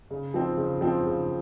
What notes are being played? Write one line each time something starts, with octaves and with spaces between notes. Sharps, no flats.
C#3
F3 C4
C#3
F3 C4
C#3